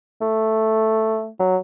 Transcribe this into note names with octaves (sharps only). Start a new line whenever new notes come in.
A3
F#3